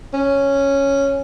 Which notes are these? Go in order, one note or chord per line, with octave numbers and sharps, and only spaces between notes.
C#4